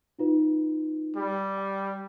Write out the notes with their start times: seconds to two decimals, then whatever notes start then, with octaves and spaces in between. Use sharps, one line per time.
0.19 D#4 F4 B4
1.16 G3
1.57 G5